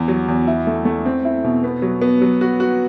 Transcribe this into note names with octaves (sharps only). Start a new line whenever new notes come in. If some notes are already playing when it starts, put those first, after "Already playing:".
Already playing: E2
F#3
E2
E4
A3
A3
C4
E4
B2
B3
F#3
B3
F#3
F#4
F#4